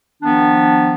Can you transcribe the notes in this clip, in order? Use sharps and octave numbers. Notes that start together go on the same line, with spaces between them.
D#3 F3 B3 D4